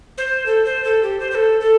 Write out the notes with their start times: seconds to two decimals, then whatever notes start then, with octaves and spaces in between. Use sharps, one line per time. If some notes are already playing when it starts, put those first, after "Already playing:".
0.18 C5
0.46 A4
0.65 C5
0.84 A4
1.03 G4
1.20 C5
1.31 C5
1.35 A4
1.61 A4